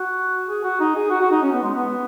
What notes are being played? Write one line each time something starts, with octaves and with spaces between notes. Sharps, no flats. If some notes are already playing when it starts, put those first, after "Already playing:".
Already playing: F#4
G#4
F#4
D#4
G#4
F#4
F#4
D#4
C#4
B3
G#3
B3